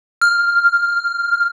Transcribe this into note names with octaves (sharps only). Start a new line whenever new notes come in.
F6